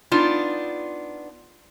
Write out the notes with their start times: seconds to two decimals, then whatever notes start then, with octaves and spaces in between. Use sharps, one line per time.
0.12 B3 D4 D#4 F4